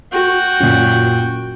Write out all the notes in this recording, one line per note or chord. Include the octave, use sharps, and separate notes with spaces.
F#4 G5
F#2 A#2